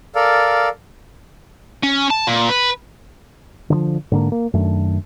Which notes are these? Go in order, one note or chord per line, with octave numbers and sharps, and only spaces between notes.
A4 A#4 D5 F5
C#4
A5
A#2
B4
D3 D#3 F3
G#2 D3 A#3
A#3
F#2 D#3 A3 D4